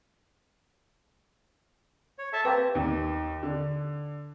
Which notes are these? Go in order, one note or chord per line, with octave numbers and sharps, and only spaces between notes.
C#5
A4 E5 A5
A#3 C4 G4 B4
D#2
D3